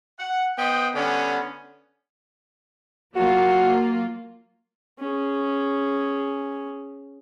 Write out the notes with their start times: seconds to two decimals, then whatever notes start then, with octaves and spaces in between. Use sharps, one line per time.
0.19 F#5
0.58 B3 C5 D#5 G5
0.94 D3 G3 B3 C#4
3.16 F#3 A#3 F4 F#4
4.99 C#4 G#4